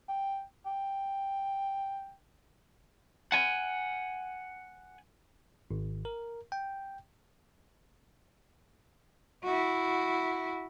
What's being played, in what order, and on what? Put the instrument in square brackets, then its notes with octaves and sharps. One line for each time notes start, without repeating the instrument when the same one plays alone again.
[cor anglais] G5
G5
[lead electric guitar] F#5 G#5
[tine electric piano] G#1
A#4
G5
[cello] E4 F#4